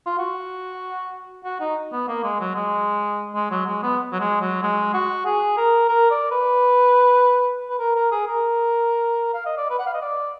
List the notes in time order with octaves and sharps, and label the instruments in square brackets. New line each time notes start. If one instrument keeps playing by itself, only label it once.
[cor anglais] F4
F#4
F#4
D#4
B3
A#3
G#3
F#3
G#3
G#3
F#3
G#3
B3
F#3
G#3
F#3
G#3
F#4
G#4
A#4
A#4
D5
B4
B4
A#4
A#4
G#4
A#4
F5
D#5
D5
B4
F#5
F5
D#5
D5